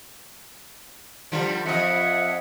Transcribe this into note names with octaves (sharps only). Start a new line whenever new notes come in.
D3 F3 G3
F2 D#5 E5 F#5